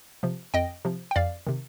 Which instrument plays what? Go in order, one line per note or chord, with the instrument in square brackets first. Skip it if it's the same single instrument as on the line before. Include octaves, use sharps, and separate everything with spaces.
[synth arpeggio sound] C3 F3
F2 D#5 G5
C3 F3
G5
F2 D5 F5
C3 D#3